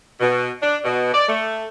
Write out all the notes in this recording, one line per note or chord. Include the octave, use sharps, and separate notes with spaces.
B2
D4
B2
D5
A3